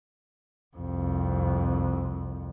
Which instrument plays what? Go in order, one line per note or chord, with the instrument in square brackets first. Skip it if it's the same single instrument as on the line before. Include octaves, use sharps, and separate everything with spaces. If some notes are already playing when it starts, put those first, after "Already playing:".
[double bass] C2 F2